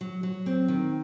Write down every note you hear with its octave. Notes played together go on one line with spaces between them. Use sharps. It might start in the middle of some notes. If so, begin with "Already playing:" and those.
F#3
F#3
C4
D#3